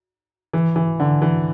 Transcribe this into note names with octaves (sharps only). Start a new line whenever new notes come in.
E3
E3
D3
E3